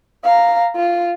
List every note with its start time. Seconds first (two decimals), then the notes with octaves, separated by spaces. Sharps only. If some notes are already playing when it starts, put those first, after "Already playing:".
0.24 F5 A#5
0.76 F4